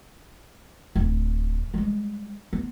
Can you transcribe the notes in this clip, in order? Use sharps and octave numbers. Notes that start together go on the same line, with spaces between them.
D1
G3 G#3
B3